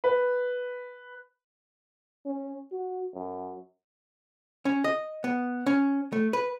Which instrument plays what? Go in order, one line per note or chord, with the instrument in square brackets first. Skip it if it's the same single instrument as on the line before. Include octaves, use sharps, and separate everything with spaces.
[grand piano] B4
[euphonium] C#4
F#4
F#2
[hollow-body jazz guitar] C#4
D#5
B3
C#4
A3
B4